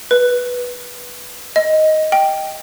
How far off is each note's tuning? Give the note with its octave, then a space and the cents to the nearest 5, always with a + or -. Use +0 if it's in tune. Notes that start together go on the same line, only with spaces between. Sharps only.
B4 -10
D#5 +5
G5 -5